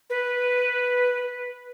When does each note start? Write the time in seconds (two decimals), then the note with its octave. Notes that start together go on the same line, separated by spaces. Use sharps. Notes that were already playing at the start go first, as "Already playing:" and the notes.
0.10 B4